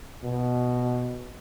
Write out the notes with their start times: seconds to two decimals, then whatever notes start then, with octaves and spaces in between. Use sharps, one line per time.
0.24 B2